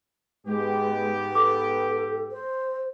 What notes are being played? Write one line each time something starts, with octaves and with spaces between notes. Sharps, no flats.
G#2 G#3 B3 G4
A4 D6
C5